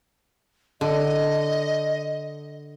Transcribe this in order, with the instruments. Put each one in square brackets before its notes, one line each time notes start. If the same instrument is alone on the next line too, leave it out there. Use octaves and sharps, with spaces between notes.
[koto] D3 [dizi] D#5